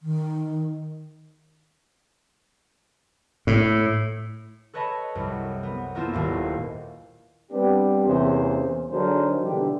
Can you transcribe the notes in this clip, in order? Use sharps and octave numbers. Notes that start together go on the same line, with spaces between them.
D#3
A2
A4 B4 C#5 D#5 A5 B5
C2 F#2
B3
A#3 B3 E4 F4 A4 C5
D#1 D#2 F5
G3 B3 C4 D4 G4
E2 C3 A#3 C4 C#4 C5
D3 F#3 D#4 G#4 A#4 C5
B2 D3 E3 G3 G4